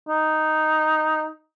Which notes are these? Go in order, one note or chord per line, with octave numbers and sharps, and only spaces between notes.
D#4